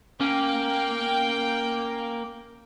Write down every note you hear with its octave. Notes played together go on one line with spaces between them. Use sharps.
A#3 C#4 G5